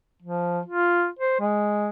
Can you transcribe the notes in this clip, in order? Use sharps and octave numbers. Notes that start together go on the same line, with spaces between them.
F3
F4
C5
G#3